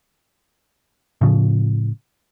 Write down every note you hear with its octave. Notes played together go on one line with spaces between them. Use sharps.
A2 C#3 F3